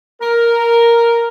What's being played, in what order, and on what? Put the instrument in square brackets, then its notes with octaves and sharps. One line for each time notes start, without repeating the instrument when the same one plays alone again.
[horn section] A#4